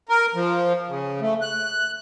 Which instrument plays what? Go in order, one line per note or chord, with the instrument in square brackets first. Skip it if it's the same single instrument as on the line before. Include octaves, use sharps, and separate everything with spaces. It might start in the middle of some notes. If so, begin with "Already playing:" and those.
[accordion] A#4
F3
C#3
A3
F#6